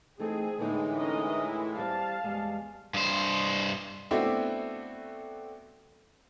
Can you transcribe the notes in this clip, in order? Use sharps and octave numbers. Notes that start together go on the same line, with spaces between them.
E3 A3 C4 D#4 G#4
A2 D3 E3 G#3 A#3 D#4
C#4 A#4 D#5
E4
G3 C4 F5 A5
E2 G3 G#3
G2 C5
A3 B3 C4 D4 E4 F#4